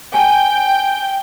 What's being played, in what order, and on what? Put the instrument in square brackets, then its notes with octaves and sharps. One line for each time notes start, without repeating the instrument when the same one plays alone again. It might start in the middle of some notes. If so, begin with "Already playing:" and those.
[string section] G5 [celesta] G#5